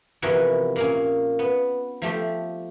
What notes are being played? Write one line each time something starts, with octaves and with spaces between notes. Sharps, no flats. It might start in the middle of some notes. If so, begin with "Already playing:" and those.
C3 E3 F3 B3 F#4 A#4
A#2 A#3 C#4
B3
F3 A3 G4